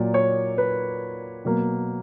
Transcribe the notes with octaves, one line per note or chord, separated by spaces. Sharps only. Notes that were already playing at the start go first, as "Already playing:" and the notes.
Already playing: A#2 F#3 A#3 D5
C#5
B4
B2 F#3 A#3